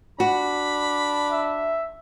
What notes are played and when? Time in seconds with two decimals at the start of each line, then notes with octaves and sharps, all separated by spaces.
0.20 D4 F#4 B5
1.31 E5